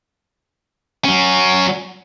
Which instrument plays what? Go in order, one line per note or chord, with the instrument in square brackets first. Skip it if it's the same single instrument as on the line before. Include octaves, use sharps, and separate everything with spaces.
[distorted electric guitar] F#3 C#4